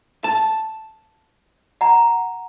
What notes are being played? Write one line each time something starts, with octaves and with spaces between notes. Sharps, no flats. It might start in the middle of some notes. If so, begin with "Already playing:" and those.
A5
F#5 A#5